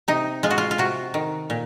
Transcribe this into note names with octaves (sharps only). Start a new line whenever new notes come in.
C3 D#4
G#3 F4
F#4
F4
F4
C3 F#4
D#3
A#2